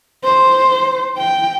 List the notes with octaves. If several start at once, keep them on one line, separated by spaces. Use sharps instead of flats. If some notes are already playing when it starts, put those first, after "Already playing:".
C5
G5